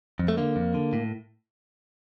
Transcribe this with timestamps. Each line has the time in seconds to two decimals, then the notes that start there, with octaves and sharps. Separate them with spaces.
0.19 F2
0.28 A3
0.37 D3 A#3
0.56 F2
0.74 D3
0.93 A2